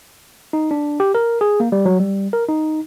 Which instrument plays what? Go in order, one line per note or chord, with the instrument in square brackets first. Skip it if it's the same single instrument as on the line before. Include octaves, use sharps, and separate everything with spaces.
[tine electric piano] D#4
D4
G4
A#4
G#4
A#3
G3
F#3
G3
A#4
D#4